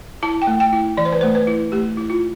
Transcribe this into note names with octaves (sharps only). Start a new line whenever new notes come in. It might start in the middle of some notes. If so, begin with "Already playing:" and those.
E4 A5
G5
A3
G5
E4
E3 D5
C5
B4
A3 C5
B4
E4
A3 G4
E4
F4